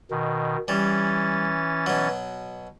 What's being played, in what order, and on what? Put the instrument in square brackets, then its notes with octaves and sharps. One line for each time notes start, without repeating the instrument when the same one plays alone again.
[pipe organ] B2 D#3
[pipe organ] E3 C#4 A6 [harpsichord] G3
[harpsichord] B2 F#3